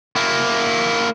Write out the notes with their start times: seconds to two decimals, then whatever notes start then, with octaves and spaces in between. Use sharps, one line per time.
0.16 A#3 E4